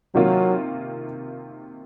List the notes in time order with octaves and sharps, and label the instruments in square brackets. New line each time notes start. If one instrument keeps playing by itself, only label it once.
[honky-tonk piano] C3 D#3 A#3 F4 [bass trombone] F#3